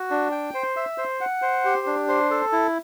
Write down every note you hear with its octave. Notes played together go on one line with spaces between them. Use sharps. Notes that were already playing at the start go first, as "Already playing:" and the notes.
Already playing: F#4
D4
G5
C5
E5
C5
F#5
C5
G4
D4
C5
A4
E4